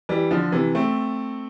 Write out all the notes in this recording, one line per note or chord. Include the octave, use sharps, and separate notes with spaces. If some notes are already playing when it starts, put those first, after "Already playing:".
E3 G3
D3 F3
C3 E3
A3 C4